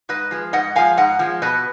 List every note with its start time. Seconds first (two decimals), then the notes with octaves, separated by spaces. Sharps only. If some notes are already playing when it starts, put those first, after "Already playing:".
0.09 G#2 B4 D#5
0.31 F3 G#3
0.53 G#2 D#5 F#5
0.76 F3 G#3 F5 G#5
0.97 G#2 D#5 F#5
1.19 F3 G#3
1.42 B2 B4 D#5